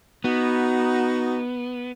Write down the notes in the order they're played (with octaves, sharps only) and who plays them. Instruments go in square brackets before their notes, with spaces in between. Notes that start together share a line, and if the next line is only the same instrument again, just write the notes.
[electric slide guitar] B3 [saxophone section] D#4 F#4